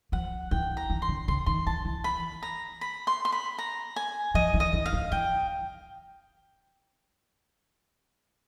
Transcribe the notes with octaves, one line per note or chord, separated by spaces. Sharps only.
F3 F#5
E3 G5
A#5
E3
C6
D3
C#3 C6
D#3 C6
E3 A5
E3
B5
A#5
B5
C6
C6
B5
A#5
G#5
F3 D#5
E3
D#5
E3
F5
F3
E3 G5